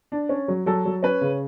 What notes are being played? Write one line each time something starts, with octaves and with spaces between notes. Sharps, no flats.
D4
C#4
F#3
F#3 A4
F#3
C#4 B4
C#3